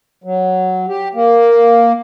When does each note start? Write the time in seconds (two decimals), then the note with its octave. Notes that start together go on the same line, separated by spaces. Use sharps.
0.24 F#3
0.88 G4
1.15 A#3